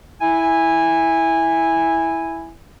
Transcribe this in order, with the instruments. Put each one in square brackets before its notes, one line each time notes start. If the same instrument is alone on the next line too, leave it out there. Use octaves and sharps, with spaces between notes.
[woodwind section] E4 G#5